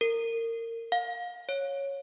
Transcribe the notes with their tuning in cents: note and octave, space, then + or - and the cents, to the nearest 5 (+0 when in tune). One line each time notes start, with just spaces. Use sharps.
A#4 -25
F5 +30
C#5 -5